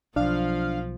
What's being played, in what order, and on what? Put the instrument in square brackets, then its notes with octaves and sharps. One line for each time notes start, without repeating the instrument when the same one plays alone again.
[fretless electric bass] B1 [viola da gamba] F3 [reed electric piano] D4 [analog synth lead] F5